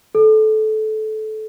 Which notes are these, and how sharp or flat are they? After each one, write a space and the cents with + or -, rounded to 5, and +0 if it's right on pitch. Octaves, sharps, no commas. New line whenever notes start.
A4 -20